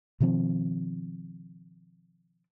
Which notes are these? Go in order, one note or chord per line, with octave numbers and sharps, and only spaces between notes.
B2 D#3 F3 C4